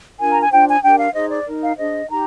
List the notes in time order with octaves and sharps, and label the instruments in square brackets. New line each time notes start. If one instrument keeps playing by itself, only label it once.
[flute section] D4 F4 A#4 G#5
A#5
G#5
D4 F4 C5 G5
G#5
D4 G4 A#4 G5
F5
D#4 G#4 C5 D#5
D5
D#4 A#4
F5
D4 G#4 C5 D#5
D#4 G4 A#5